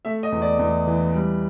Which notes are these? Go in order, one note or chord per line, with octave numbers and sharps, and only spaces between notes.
A3 E5
D#5
E2
D5
E2
E3
G3